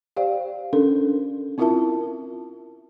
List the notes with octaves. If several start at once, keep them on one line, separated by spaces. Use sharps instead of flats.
G4 C5 D5 F5 G5
C#4 D4 A4 A#4
C4 E4 F4 A#4 E5 A5